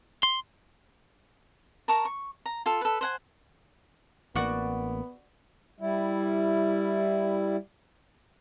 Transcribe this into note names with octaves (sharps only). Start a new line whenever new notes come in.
C6
A#4 A5 A#5 C#6
C#6
A#5
F4 A4
A4 B4
C5 F#5 G#5
A1 A#3 B3 F#4 D5 F#5
G3 E4